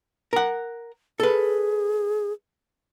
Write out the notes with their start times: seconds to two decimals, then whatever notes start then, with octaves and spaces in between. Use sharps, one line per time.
0.33 A#4 F#5
1.20 G#4 A4 B4